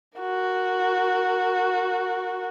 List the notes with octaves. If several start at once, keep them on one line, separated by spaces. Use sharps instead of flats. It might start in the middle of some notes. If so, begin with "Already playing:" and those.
F#4 A#4